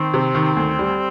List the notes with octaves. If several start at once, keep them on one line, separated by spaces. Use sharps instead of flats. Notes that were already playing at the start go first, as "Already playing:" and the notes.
Already playing: D#3 C4
C3
D#3
D2
G3